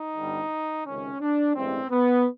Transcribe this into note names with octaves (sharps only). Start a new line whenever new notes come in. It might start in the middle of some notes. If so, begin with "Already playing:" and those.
Already playing: D#4
G1 G2 D3 G3
C#2 C3 D#3 C#4
D4
A1 G2 E3 G#3 C4
B3